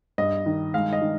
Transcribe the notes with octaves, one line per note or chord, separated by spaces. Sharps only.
G2 D#5
D#3
G#3 F5
D#5
D#3